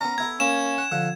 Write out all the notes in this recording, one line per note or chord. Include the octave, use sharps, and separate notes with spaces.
B3 C#4 A#5
B3 E4 A4 G#6
A#3 C#4 E7
F#5
D3 F3 F#5